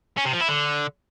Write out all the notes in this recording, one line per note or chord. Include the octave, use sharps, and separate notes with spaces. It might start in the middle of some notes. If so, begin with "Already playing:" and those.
C#4
C3
F3
E4
D3